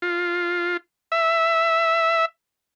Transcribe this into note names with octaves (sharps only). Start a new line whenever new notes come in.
F4
E5